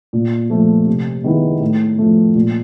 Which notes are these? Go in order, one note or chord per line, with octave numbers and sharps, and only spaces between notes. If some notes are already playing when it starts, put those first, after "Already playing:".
A#2
F3 A3
C3
D#3 G#3 B3 E4
A2
F3 A3
A#2